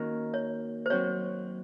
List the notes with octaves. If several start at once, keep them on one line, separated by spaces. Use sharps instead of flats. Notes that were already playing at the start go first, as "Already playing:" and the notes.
Already playing: D#3 A#3 C#4 F#4 A#4
C#5
C5
F#3 C4 F#4 C#5